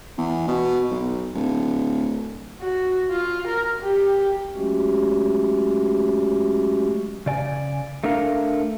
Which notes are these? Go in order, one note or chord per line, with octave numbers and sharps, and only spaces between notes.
E2
B2
B1
D1
F#4
F4
A#4
G4
F#3 G#3 A3 C#4 F#4 G4
C#3 D5 G#5
A3 D4 A#4 F5